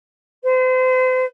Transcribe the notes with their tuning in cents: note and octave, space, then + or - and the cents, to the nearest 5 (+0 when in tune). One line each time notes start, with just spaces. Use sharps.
C5 -35